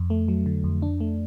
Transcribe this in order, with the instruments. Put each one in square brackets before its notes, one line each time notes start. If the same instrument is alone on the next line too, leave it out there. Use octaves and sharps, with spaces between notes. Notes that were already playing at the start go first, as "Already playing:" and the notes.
Already playing: [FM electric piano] F2
A3
F#3
D3
F2
D4
A3